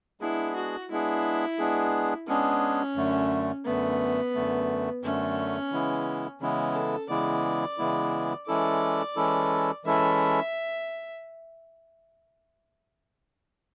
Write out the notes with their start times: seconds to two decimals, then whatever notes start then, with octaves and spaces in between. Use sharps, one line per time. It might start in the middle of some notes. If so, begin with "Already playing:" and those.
0.21 G#3 B3 D4 E4 G#4
0.56 F#4
0.90 G#3 B3 D4 E4 G#4
1.58 G#3 B3 D4 G#4
2.28 G#3 B3 C#4 D4 G#4
2.96 F#2 D3 A3
3.65 F#2 D3 A3 B3
4.35 F#2 D3 A3
5.03 F#2 D3 A3 C#4
5.72 C#3 E3 G#3 B3 E4
6.41 C#3 E3 G#3 B3 C#4 E4
6.75 A4
7.09 C#3 E3 G#3 B3 E4 D5
7.78 C#3 E3 G#3 B3 E4
8.47 E3 G#3 C#4 E4 A4 D5
9.16 E3 G#3 C#4 E4 A4
9.85 E3 G#3 C#4 E4 A4 E5